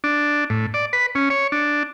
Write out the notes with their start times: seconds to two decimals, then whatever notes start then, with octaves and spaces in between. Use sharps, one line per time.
0.04 D4
0.50 A2
0.74 D5
0.93 B4
1.15 C#4
1.30 C#5
1.52 D4